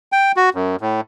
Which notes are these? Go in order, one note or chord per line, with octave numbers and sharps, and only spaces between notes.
G5
F#4
F#2
A2